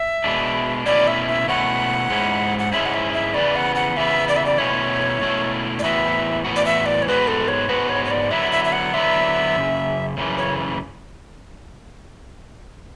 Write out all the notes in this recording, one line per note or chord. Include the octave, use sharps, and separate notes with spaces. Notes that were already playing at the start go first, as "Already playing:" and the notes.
Already playing: E5
B2 G#3 D4
B2 A3 C#4 E4 D5
E5
E5
B2 A3 C#4 E4 F#5
G#2 G#3 C#4 E4
F#5
G#2 G#3 C#4 E4 E5
F#5
E5
E5
C#3 E3 B3 D5
F#5
F#5
C#3 E3 B3 E5
D5
E5
D5
B2 A3 C#4 E4 C#5
B2 A3 C#4 E4
D5
A2 E3 B3 F#4 E5
A2 E3 B3 F#4
D5
E5
D5
C#5
G#2 G#3 B3 F#4 B4
A4
C#5
G#2 G#3 B3 F#4 B4
C#5
C#5
D5
D3 F#3 B3 E4 E5
E5
E5
F#5
D3 F#3 B3 E4 E5
F#2 C#3
F#2 C#3 E3
C#5